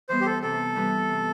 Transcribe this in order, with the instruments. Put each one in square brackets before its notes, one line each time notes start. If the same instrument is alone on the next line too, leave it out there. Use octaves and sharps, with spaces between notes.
[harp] E3 G3 B3 [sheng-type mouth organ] C5
[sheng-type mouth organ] G4
A4
[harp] C3 [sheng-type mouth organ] A4
[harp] E3 G3 B3
C3